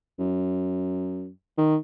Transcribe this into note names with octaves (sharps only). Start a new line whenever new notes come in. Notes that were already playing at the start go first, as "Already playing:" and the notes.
F#2
D#3